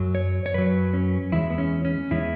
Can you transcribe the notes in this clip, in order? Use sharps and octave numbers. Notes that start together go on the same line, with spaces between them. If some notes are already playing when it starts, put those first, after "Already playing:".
Already playing: F#2 F#3
C#5
C#5
F#2 F#3 B4
C#4
E2 E3 G#3 E4
B3
C#4
C#4
E2 E3 G#3 E4